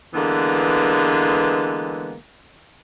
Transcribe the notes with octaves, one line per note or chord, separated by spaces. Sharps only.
D3 E3 G#3 A#3 B3